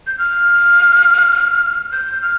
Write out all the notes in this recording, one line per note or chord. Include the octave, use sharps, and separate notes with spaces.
G6
F6
G6
F6